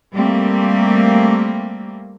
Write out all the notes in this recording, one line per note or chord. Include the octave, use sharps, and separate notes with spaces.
G3 A3 A#3 C4